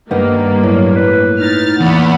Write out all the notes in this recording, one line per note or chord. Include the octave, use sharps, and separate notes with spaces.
G2 D#3 A#3 B3
A2 F#3
B4
D#4 F6 A6
E2 A#3 F#5 B5